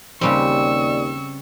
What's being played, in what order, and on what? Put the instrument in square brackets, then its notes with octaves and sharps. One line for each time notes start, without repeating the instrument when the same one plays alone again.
[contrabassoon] D#2 [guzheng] C#3 G3 C4 [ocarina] D5 [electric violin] C#6 E6